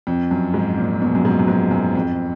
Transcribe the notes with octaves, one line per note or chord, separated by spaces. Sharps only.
F2
F#2
G#2
A#2
B2
F#2
G#2
F#2
G#2
F#2
F2